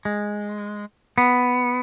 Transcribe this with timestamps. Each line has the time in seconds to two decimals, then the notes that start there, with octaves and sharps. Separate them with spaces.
0.05 G#3
1.18 B3